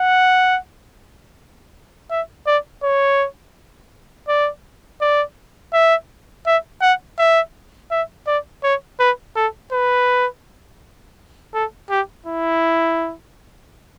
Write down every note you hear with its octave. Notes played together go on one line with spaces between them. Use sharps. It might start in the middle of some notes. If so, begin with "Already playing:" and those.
Already playing: F#5
E5
D5
C#5
D5
D5
E5
E5
F#5
E5
E5
D5
C#5
B4
A4
B4
A4
G4
E4